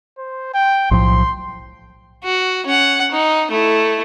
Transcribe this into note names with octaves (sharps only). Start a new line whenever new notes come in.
C5
G5
B1 A2 F3 C6
F#4
C#4 F#5
D#4
A3 E4